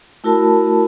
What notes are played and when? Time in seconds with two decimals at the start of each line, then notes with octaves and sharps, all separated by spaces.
0.24 A3 E4 F#4 A#4 A5 B5